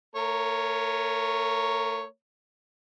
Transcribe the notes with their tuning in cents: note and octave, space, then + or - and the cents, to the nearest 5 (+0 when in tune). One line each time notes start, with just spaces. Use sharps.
A3 +35 A#4 +0 C#5 +0